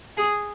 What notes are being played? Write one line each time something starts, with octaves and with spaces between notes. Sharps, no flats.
G#4